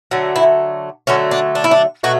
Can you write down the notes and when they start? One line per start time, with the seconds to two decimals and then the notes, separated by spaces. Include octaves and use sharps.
0.11 D3 F#3 A3
0.36 E4
1.07 D3 F#3 A3 C#4
1.31 D4
1.55 D4
1.64 E4
1.71 D4
2.03 B2 F#3 A3 F#4